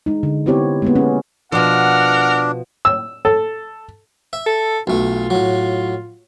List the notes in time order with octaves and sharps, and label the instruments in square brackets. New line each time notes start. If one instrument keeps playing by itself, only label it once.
[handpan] G#3 D#4
D3
B3 C4 E4 G4 C#5
G#3 A#3 B3
C#4 G#4
[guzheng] B2 F3 [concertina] D4 [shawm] A#4 [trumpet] F#5
[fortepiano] E6
A4
[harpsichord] E5
[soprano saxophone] A4
[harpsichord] B1 A3 [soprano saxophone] F4
[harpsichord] A2 F#3